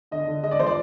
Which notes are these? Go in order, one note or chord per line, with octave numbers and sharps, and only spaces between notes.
D3 D#5
D3
G#3 D#5
D5
F3 C5
D5